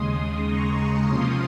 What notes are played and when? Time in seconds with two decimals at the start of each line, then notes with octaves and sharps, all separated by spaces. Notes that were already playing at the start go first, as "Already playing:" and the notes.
Already playing: D#2 C#3 G#3 C6 D#6
0.45 A#5 C#6
1.06 C3 F3 A#3 C#4 F4 C6 D#6